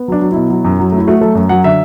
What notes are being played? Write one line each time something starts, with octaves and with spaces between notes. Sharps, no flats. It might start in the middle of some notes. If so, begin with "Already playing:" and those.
Already playing: B3
F#3 D4
F#3
B2 E4
F#3
F#2
F#3
A3
E4
A3 F#4
F#3 A4
F#2
F#3 F#5
D3 E5